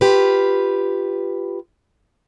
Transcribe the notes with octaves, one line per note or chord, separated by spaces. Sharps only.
F4 G4 B4